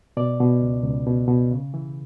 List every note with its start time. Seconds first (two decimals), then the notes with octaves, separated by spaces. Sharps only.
0.17 B2 D5
0.40 B2
0.62 C#2
0.84 C#2
1.07 B2
1.28 B2
1.51 C#3
1.74 E3